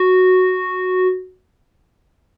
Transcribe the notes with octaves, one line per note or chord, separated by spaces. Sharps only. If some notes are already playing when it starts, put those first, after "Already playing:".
Already playing: F#4